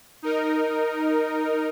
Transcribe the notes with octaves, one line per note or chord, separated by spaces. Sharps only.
D#4 A#4